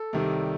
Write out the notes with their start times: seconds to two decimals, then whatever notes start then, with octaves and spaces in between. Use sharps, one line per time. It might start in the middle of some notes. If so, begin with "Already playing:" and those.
Already playing: A4
0.13 C2 C3 D#3 G3